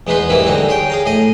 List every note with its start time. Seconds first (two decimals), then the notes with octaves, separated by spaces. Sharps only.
0.07 E2 G#3 B3 D#4 B4 C6
0.29 G#2 C3 E3 G3 A#3 E4
0.46 D3 G3 G#3 D#4 F#4
0.69 G#4 C#5 G5
0.90 G#4 F5 A#5
1.06 A2 G#4 D#5